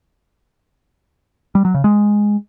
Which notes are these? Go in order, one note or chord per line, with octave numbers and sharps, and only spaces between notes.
G3
F#3
C#3
G#3